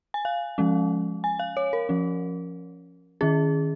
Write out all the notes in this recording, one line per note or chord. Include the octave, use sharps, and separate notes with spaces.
G#5
F5
F3 G#3 C#4
G#5
F5
C#5
A#4
F3 C#4
D#3 C#4 G#4